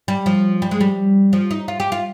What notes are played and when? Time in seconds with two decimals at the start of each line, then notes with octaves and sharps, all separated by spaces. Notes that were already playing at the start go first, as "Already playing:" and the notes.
0.08 G3
0.26 F3
0.62 G3
0.71 G#3
0.81 G3
1.33 F3
1.51 D#4
1.68 F4
1.80 G4
1.92 F4